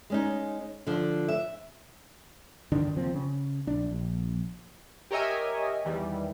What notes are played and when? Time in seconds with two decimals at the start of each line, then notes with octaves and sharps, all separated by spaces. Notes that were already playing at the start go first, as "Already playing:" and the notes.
0.10 G#3 C#4 D#4
0.87 D3 F3
1.28 E5
2.72 G2 D3 D#3 D4
2.95 F#1 D#2 F3 C4
3.14 C#3
3.67 A#1 D4
3.91 A#1
5.11 G4 A#4 C#5 D#5 E5 G#5
5.85 E2 D#3 E3 G3